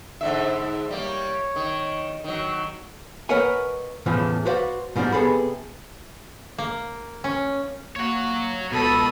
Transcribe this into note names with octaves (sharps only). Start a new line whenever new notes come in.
G#2 D3 E5
G3 A#3 C#5
D#3
D#3 F#3
A#4 B4 C#5 D#5 F#5 G#5
E2 A2 C#3 E3 F3
F#4 B4 C5 D5 F5 F#5
G#2 B2 F3 G3 D4
C3 B3 G#4 A4 B5
A#3
C#4
A#3 C#5 F#5
C#2 B2 A4 B5 D#6